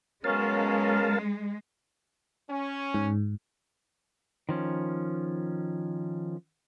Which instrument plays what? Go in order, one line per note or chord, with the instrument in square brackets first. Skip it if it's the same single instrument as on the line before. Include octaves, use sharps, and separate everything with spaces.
[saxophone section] F#3 B3 C#4 [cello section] G#3 [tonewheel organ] A#4 F5 A5
[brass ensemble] C#4
[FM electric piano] G#2
[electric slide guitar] D#3 F3 C#4